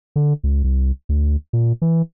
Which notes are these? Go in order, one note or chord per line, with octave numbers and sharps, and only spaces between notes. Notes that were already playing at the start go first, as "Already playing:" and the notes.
D3
C#2
C2
D2
A#2
E3